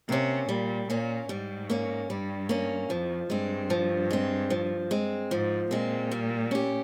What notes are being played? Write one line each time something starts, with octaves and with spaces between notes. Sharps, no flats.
C3 A#3 C#4
A#2 G3
A#2 A#3 C#4
G#2 G3
A#3 C#4
G2 G3
A#3 C#4
F2 F3
G2 G#3 C4
F3
G#3 C4
F3
G#3 C4
G#2 F3
A#2 G#3 C4
G3
C#4 G4